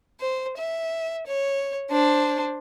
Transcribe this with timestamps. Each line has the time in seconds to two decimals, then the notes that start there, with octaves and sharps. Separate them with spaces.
0.20 C5
0.57 E5
1.27 C#5
1.90 D4 C5